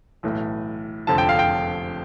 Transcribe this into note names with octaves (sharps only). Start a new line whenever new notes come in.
B1 A2 E3
F1 F2 D3 F3 A5
G5
F5
G5